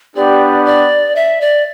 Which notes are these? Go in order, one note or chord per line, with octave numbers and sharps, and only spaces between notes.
B3 D4 G4 D5
D5
E5
D5